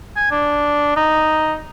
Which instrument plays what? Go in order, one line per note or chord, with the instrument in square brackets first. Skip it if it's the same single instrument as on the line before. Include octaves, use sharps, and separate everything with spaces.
[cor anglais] G#5
D4
D#4